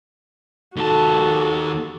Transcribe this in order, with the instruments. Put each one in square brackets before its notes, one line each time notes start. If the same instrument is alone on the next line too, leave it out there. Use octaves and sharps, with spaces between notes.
[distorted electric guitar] D#2 A5 [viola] F#4 A4